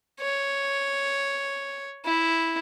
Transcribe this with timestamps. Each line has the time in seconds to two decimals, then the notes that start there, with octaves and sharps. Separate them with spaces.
0.20 C#5
2.06 E4